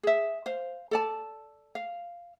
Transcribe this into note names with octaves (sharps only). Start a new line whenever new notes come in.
G#4 E5
C5 F5
A4 D5 A5
F5